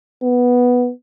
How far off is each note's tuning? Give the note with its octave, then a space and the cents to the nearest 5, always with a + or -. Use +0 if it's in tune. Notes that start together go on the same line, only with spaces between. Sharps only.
B3 -5